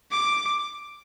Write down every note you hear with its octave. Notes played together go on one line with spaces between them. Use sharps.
D6